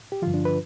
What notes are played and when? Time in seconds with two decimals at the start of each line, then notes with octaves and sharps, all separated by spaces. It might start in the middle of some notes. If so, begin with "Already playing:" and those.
0.12 G4
0.22 G2 D3 F3 F4
0.34 D4
0.45 B4